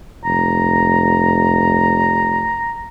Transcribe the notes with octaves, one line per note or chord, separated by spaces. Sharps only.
F1 A#5